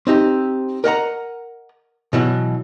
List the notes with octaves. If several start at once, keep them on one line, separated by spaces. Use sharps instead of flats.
C4 D#4 G4
A#4 D#5 F#5 A#5
B2 E3 F#3